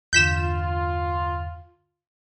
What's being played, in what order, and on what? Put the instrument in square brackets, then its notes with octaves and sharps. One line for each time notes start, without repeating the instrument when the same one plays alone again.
[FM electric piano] E2 G2 D3 [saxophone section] F4 [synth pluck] G6 B6 E7